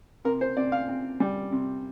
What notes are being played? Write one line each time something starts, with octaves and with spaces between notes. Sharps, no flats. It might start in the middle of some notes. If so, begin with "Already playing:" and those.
C3 A#4
C5
C3 D5
F5
C4
G3
C3